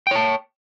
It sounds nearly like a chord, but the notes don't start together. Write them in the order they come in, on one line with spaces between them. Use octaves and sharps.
G5 C#5 A5